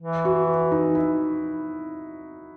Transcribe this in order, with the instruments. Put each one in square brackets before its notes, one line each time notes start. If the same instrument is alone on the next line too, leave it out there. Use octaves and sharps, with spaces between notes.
[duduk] E3
[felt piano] F#4
D#4
E4